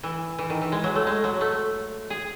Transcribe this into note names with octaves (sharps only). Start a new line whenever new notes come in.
E3
E3
D#3
E3
G#3
F#3
A3
G#3
F#3
A3
G#4